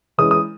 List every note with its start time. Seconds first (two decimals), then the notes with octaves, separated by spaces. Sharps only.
0.18 E3 G#3 C#4 E4 D#6
0.31 D#6